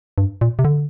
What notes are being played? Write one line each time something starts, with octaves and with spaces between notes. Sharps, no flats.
G2
A#2
C3
D3